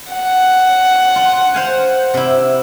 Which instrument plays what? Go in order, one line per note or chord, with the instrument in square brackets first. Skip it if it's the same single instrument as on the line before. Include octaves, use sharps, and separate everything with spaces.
[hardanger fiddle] F#5
[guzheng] F4
C5 F5 G#5
C3 E4